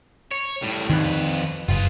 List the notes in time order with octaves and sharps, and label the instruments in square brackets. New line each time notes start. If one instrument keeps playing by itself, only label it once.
[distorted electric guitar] C#5
A2 G3
[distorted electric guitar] F2 B4 [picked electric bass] D#3
[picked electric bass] F#1 [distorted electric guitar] F4 B4